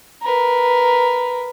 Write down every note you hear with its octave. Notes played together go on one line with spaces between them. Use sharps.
A#4 B4